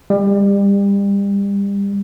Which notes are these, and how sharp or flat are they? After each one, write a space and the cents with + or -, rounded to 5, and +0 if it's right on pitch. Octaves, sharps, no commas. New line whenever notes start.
G3 +30